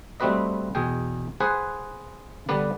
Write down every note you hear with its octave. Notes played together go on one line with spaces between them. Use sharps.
G3 A3 C4 F#4 B4 D#5
E2 B2 G#4 G5
G#4 B4 C5 F#5 G#5
D3 G3 B3 B4 D5